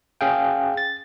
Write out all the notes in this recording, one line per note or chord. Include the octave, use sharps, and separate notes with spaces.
C#4 G#4 F5 G5
A6